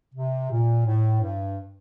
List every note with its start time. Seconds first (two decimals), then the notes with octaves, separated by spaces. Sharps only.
0.14 C3
0.50 A#2
0.85 A2
1.21 G2